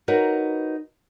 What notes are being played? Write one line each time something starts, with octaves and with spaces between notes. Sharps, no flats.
D#4 F#4 A#4 B4 C#5